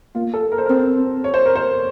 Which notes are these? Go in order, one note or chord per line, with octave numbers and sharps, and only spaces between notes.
A#3 F4
A4
A#4
C5
C4 A#4
C#5
C5
A#4
C5